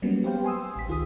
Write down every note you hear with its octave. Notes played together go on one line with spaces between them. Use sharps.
F#3 G3 A#3 B3 C#4
G4 B4 C5 F5 G5
G#5 C6 D#6 E6
A1 B6
C#2 D#3 F4 G#4 D#6